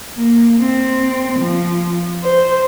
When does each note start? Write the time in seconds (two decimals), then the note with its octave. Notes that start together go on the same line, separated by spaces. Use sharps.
0.16 A#3
0.59 C4
1.39 F3
2.23 C5